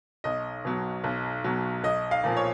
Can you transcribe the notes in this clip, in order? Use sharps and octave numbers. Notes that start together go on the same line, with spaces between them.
B1 D#5
B2 F#3
B1
B2 F#3
B1 D#5
F5
A#2 F3
C#5